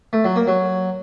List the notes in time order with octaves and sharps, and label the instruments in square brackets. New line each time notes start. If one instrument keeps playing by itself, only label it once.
[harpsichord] A3
F#3
A#3
F#3